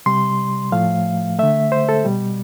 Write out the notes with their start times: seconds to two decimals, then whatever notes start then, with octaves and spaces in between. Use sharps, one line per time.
0.06 C3 G3 C6
0.72 A2 F3 A3 F5
1.39 D3 A3 E5
1.72 C5
1.89 A4
2.05 B2 G3